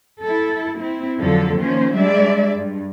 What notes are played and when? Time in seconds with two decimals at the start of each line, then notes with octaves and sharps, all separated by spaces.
0.24 E4 A4
0.80 C4 E4
1.18 F2 D3 F3 F#3 A4
1.59 D#3 F3 A#3 C#4 C5
1.95 G3 G#3 D4 D5 E5
2.56 G2